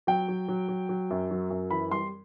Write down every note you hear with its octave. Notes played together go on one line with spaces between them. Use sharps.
F#3 G5
F#3
F#3
F#3
F#3
F#2
F#3
F#2
E3 B5
G3 C6